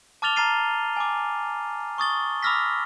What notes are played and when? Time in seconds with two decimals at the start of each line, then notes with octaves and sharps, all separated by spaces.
0.22 A5 D6 F6 A6 F7 G7
0.36 A5 A#5 F6 A6 C7 D#7
0.97 G#5 D6
1.98 C#6 D#6 A6 G7
2.43 B5 D6 E6 F6 A#6 B6